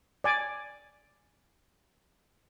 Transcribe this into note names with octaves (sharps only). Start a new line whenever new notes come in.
D5 G#5 D6